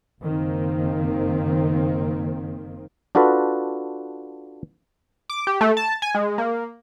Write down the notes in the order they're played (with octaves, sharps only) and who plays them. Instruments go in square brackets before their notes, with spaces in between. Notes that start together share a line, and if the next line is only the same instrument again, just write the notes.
[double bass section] F#1 D#3 A#3 C4
[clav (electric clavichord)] D4 F4 F#4 A4 B4
[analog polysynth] D6
G4
A3
A5
G#5
G#3
A#3